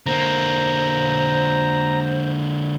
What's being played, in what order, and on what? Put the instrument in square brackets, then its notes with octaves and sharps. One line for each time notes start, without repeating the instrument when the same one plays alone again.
[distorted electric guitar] D3 A#3 [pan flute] C5 [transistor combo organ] A#5